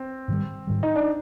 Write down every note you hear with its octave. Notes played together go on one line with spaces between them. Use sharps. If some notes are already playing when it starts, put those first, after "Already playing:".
Already playing: C4
G#2 D#3 G3
G#2 D#3 G3
D#4
D4